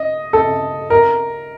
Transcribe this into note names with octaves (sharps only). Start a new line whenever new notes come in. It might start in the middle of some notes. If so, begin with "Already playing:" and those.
Already playing: D#5
A4
A#4